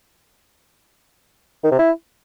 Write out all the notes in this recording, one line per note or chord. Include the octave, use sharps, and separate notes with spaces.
D#3
C3
E4